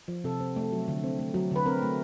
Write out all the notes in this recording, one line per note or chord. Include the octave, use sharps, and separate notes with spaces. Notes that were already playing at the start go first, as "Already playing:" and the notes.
F3
C3 A4
C4
A3
F#3
D3
C4
A3
F#3
D3 B4
C4 A#4
A3